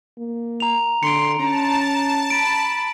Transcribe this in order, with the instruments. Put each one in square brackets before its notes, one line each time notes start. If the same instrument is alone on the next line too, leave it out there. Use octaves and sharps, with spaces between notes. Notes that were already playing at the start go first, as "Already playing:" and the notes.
[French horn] A#3
[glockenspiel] A#5 F7
[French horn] D3 [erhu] C6 [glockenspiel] C#7 D7
[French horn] C#4 [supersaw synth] A5 [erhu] A#5
[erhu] B5 [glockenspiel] D7